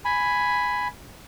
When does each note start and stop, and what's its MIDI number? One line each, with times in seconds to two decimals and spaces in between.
0.05 0.88 80
0.05 0.88 83